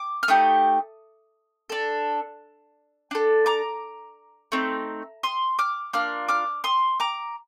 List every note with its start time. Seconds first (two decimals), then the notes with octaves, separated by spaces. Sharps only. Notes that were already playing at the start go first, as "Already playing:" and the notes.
Already playing: D6
0.23 F6
0.28 A3 D#4 G4 D#6
1.69 D4 A4
3.11 D4 A4
3.46 A#5 D6
4.52 A3 C4 D#4
5.23 C6 D#6
5.59 D6 F6
5.93 A#3 D4 F4 D6 F6
6.28 D6 F6
6.64 C6 D#6
7.00 A#5 D6